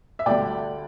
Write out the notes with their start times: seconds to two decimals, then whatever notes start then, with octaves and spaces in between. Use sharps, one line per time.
0.19 E5
0.26 D2 D3 G3 D5 G5